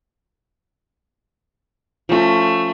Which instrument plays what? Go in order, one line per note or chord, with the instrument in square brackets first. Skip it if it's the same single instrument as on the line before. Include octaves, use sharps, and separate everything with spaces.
[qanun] F3 C#4 [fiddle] A3